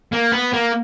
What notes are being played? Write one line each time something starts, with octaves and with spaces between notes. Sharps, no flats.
A#3
B3
A#3